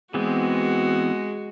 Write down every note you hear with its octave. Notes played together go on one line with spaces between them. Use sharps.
E3 G#3 B3 C4 F#4